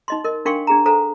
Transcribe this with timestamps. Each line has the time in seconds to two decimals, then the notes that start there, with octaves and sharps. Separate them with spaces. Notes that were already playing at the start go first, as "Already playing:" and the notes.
0.08 D#4 D#5 C6
0.24 A#4 D#5
0.45 D4 A#4 F5 G5 C6 C#6
0.67 D4 G#4 A#5
0.86 A4 C5 F5 G#5 A#5